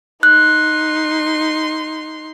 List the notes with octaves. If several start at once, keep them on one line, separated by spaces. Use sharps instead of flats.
D#4 C6 F#6